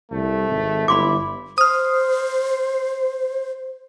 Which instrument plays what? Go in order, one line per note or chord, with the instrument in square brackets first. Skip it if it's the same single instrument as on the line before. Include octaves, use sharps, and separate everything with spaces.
[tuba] C2 [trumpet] A3
[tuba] G#1
[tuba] G1 [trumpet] E4 [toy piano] B5 C6 D6
[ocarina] C5 [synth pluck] D#6 F6